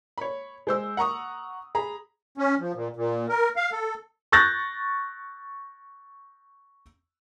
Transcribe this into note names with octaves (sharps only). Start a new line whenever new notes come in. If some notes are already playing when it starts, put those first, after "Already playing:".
C#5 B5
G#3 C5 E6
F#5 A#5 C#6 D#6
G#4 A#5 B5
C#4
F3
A#2
A#2
A#4
F5
A4
C#6 F#6 G6 A6 A#6